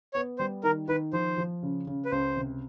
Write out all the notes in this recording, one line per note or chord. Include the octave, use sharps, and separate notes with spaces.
B3 C#5
G3 C5
D#3 A#4
D#3 B4
F3 C5
F3
C#3
C#3
B4
C#2 C5
C3